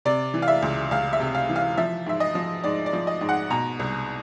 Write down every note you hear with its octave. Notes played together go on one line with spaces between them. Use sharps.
C3 D5
E3
F5
E5
C#2
C#2 F5
E5
C3
F5
E3
F5
F3 E5
G#2 E5
D#5
F3
G#2 D5
D5
F3
D#5
G#2
F#5
B2 A#5
C2